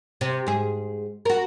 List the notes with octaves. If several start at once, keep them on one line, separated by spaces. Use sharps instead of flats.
C3
G#2 G#4
F#4 A#4